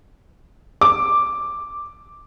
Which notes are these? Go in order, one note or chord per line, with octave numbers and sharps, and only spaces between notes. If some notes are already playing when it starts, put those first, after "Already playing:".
D6